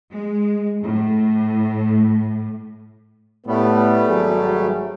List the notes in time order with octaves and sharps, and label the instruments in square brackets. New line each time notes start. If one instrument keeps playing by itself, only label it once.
[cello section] G#3
A2
[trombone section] A2 B3 [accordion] G3 A3
[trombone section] G#1 F#3 G#4